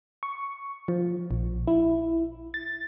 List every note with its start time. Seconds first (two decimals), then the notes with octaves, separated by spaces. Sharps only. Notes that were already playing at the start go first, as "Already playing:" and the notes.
0.23 C#6
0.88 F3
1.31 A#1
1.67 E4
2.54 A6